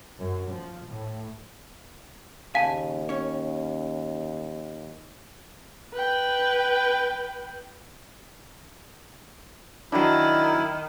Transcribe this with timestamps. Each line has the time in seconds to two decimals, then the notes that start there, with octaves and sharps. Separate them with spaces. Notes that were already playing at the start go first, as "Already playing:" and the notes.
0.18 F#2
0.51 F3
0.85 A2
2.55 D#2 A#2 C#3 F5 G#5 A5
3.09 C#4 C#5
5.93 B4 G5
9.92 D#3 F#3 D4 E4